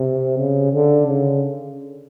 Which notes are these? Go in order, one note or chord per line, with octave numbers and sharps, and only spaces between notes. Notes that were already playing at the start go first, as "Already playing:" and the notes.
Already playing: C3
C#3
D3
C#3